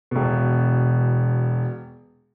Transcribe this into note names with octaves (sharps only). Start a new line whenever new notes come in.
E1 B2